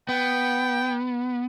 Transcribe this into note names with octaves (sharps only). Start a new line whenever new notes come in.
B3 G5